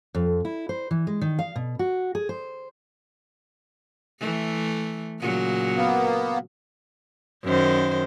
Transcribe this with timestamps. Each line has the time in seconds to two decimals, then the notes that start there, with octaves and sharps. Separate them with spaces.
0.15 F2
0.45 E4
0.69 C5
0.91 E3
1.07 G#3
1.21 D#3
1.39 F5
1.56 B2
1.79 F#4
2.15 G#4
2.29 C5
4.19 E3 A3
5.20 A#2 C#3 F#3
5.77 A#3 B3
7.44 F#2 D#3 C5